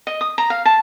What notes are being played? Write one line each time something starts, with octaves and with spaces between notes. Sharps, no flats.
D#5
D#6
A#5
F5
A5